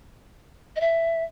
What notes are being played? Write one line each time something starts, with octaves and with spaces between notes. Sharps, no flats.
D#5
E5